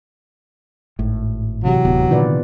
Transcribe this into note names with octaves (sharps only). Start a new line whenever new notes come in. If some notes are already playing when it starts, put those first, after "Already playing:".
G#1 A2
C3 E3 F#3 G4
D1 B3
A#2 D3 D#3 F4 B4 D5